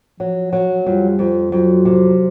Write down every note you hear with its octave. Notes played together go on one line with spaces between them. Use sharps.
F3 F#3
F#3
F2 G3
F2
F2 F#3
C3